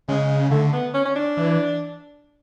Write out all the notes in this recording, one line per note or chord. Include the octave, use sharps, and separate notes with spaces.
C#3 G#3
D3 A3
B3
C#4
C#4
D4
E3